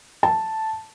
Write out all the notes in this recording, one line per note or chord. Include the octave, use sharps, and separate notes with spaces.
A5